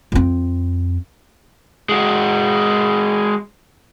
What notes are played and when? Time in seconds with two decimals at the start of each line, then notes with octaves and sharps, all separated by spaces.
0.12 F2 C4
1.89 G#3 F#4